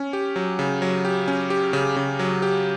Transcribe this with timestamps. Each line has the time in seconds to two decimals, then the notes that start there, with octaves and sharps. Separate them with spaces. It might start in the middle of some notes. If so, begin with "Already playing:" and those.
Already playing: C#4
0.13 G4
0.36 F#3
0.59 C#3
0.82 F#3
1.05 G4
1.28 C#4
1.50 G4
1.73 C#3
1.96 C#3
2.19 F#3
2.42 G4